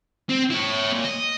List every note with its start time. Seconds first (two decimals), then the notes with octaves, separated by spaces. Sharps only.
0.29 C4
0.50 E4 C#5
0.92 A#2
1.05 D#5